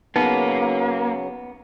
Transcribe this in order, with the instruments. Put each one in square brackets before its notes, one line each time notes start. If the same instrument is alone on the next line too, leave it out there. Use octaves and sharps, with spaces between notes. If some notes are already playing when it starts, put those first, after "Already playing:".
[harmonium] C#3 F#3 [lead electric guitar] A#3 [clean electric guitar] B3 [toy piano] D#4